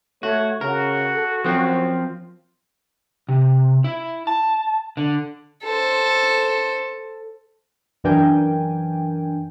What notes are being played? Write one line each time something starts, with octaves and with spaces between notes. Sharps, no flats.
A3 F#4 C#5
C#3 F#4 A#4
A4
F#2 F3 C4
C3
E4
A5
D3
A4 C5
F#2 E3 D4 A#4 G5 G#5